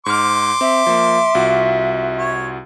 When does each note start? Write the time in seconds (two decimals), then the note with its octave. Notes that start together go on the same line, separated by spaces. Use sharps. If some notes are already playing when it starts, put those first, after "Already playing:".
0.06 G#2 C6 D6 F6
0.61 C4 E5
0.86 F3 A#3
1.35 C2 F4 F#4
2.17 C#5